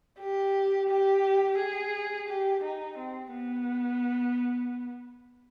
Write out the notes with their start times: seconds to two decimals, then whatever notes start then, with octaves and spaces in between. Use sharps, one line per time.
0.20 G4
0.90 G4
1.58 G#4
2.29 G4
2.64 D#4
2.98 C4
3.34 B3